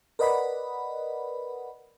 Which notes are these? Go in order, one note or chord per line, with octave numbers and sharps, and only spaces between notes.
A#4 B4 D5 D#5 F#5 B5